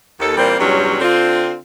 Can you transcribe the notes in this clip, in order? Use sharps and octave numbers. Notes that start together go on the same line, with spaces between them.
D#2 A4
A#2 E3 G3 A#3 C4
E2 G2 C3 F#3 G3 C#4
D3 C4 F4